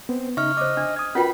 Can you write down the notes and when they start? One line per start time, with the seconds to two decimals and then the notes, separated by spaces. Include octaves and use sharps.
0.09 B3 C4
0.37 C#3 D#4 E5 C#6 F6
0.57 C5 D#5 D6
0.77 D4
0.96 D#6 G#6
1.15 C#4 F4 F#4 A#4 B4 G5 B5